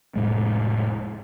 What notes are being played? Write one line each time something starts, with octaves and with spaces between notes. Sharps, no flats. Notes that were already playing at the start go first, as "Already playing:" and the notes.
F1 A2 G#3